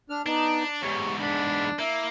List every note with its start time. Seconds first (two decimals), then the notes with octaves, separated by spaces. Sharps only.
0.10 D4 F6
0.26 B3 D4 D#4
0.82 E2 G#2 G3 C#5
1.19 D4 B5
1.79 A#3 E4